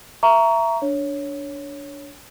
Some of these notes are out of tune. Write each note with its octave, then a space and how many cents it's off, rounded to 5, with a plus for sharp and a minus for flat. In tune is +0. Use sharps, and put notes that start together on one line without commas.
E5 +20 A#5 +0 C#6 +25
D4 -10 C#5 +0